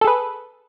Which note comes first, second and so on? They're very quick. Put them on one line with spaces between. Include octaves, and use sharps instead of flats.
A4 G#4 B4